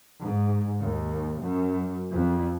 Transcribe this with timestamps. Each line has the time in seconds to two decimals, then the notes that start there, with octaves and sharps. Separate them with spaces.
0.22 G#2
0.80 D#2
1.40 F#2
2.12 F2